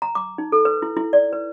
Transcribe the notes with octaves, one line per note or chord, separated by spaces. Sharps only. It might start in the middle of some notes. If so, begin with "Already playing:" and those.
A#5
D6
D#4
A4
B4
E4
E4
D5
B4